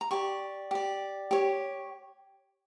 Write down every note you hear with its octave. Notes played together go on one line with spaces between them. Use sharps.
A#5
G4 D5 C#6
G4 D5
G4 C#5